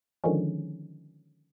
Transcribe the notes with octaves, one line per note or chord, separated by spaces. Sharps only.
D3 D#3 F3 G#3 C#4